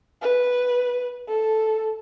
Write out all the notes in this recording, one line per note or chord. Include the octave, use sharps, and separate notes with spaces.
B4
A4